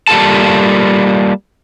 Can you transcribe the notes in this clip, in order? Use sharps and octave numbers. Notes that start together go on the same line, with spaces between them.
G3 A#3 F4 A4 A5